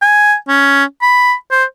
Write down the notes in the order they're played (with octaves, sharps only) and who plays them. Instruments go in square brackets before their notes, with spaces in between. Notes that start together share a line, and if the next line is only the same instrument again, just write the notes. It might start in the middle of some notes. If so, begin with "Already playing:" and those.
[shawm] G#5
C#4
B5
C5